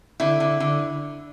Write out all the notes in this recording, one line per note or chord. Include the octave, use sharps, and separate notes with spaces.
D3 E4
D3
D3